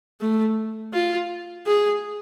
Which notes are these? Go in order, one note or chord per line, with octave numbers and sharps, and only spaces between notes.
A3
F4
G#4